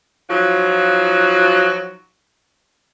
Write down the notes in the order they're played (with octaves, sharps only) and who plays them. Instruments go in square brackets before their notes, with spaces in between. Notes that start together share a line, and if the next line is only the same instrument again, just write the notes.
[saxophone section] F3 F#3 D#4 F4 F#4